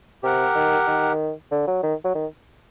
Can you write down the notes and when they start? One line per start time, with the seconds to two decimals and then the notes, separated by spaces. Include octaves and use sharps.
0.23 C3 G4 A#4 F#5
0.55 D#3
0.87 D#3
1.51 D3
1.68 F#3
1.83 D#3
2.04 F#3
2.15 D#3